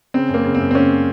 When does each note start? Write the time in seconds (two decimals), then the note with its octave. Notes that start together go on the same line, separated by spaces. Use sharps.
0.14 C#3 C4
0.29 F#2
0.34 A#3
0.45 C#3
0.55 C4
0.60 F#2
0.71 C4
0.75 C#3 A#3 C#4